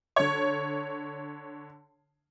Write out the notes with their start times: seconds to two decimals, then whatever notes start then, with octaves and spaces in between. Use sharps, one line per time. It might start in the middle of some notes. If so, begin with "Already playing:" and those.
0.16 D3 C#5